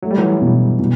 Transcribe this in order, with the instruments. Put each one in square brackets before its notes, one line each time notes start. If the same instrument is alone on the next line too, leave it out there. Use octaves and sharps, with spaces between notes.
[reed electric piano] F#3 [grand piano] A3
[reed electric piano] G3
E3 F#3
[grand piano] B2
B2